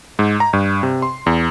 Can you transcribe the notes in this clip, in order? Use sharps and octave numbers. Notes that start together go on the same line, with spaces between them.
G#2
A#5
G2
C3
C6
E2